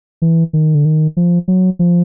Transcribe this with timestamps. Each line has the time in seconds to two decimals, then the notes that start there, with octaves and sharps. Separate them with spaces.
0.22 E3
0.53 D#3
0.75 D3
0.85 D#3
1.17 F3
1.48 F#3
1.79 F3